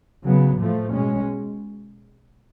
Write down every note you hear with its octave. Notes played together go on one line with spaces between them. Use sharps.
C#3 F#3 B3
A2 F3 A3
B2 G#3 C#4